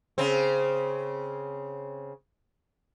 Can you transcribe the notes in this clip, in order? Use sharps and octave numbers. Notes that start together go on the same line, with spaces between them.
C#3 C4